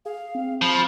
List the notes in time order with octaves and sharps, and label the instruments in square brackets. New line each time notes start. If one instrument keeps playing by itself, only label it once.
[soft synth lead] G#4 [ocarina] F5
[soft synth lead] C4
[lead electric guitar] F3 [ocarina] B5